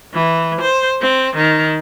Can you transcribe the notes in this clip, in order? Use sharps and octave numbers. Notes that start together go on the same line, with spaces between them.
E3
C5
C4
D#3